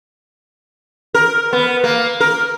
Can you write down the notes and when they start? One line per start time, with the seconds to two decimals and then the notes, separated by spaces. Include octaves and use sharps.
1.14 A#4
1.53 B3
1.84 A#3
2.20 A#4